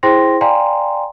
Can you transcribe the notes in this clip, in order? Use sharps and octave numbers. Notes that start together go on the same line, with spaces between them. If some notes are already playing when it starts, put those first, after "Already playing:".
E4 G#4 C5 G5 C6 A#6
D5 F5 G5 G#5 A#5 C6